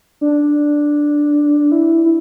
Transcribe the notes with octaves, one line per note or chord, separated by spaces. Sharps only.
D4
E4
E4